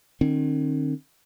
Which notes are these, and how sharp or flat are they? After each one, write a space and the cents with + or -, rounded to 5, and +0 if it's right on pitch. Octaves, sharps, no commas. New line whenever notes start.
D#3 -40 C4 +35